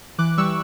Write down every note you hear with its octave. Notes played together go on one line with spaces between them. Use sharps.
E3 D6 F#6
G3 C#6 E6